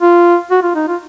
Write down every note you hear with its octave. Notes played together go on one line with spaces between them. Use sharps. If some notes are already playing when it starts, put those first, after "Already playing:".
F4
F#4
F4
D#4
F4